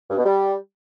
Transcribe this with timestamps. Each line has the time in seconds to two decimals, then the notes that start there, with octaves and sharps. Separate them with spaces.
0.09 G2
0.17 B2
0.25 G3